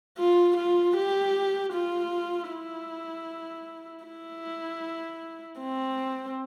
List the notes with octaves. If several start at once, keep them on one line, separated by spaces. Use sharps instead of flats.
F4
F4
G4
F4
E4
E4
C4